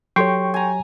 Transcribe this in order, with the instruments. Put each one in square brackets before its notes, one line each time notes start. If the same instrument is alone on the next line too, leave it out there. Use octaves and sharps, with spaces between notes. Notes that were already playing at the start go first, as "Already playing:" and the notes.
[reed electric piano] F#3 G4 C#5 [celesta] A4 C6 C7 [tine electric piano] G5 C#6
[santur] G#5 A#5